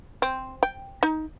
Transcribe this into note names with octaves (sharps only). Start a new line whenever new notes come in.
C4
G5
D#4